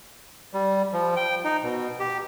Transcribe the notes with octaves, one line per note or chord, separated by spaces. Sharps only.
G3
F3
G5
D#4
B2
G4